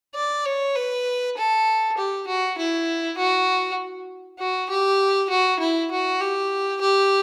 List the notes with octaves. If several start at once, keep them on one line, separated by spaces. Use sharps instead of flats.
D5
C#5
B4
A4
G4
F#4
E4
F#4
F#4
G4
F#4
E4
F#4
G4
G4